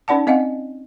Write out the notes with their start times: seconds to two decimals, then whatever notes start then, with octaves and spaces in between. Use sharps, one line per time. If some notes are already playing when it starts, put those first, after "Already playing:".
0.08 C#4 D#4 D5 F#5 A5
0.27 C4 D#5 F5 F#5